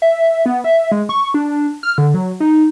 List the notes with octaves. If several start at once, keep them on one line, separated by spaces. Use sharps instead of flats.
E5
B3
E5
G#3
C#6
D4
F6
D3
F#3
D#4